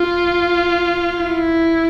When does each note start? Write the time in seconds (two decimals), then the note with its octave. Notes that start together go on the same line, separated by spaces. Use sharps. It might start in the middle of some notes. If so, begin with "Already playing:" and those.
Already playing: F4
1.23 E4